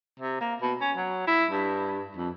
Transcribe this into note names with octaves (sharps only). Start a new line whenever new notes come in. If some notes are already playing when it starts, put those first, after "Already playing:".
C3
A#3
B2
C#4
F#3
E4
G2
F2